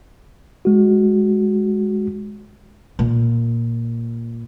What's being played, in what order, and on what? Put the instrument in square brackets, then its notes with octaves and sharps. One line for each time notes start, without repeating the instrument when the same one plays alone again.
[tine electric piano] G#3 F#4
[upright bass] A#2